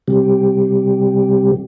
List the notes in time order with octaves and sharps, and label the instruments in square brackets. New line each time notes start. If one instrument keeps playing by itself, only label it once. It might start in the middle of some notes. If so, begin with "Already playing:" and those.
[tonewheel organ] C3 G3